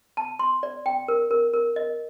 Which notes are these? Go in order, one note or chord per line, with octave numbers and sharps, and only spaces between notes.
A5
C6
D5
G5
A#4
A#4
A#4
D#5